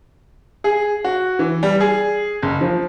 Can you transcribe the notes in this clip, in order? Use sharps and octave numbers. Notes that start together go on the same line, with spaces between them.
G#4
F#4
E3
G3
G#4
F#1
F3